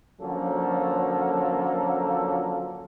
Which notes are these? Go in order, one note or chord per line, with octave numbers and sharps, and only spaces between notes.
D3 F3 F#3 A#3 C#4 A4